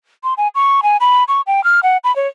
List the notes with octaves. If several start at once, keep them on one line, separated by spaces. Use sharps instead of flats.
C6
G#5
C#6
G#5
B5
C#6
G5
F6
F#5
B5
C#5